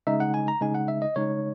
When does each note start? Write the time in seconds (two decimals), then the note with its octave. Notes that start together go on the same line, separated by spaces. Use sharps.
0.07 C#3 G#3 D#4 E5
0.20 F#5
0.34 G#5
0.48 A#5
0.61 C#3 G#3 D#4 G#5
0.74 F#5
0.88 E5
1.02 D#5
1.16 C#3 G#3 D#4 C#5